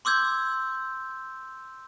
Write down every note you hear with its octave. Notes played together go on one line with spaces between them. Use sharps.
C6 D6 E6 G6 G#6